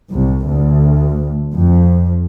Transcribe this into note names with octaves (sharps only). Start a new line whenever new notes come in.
C2
D2
F2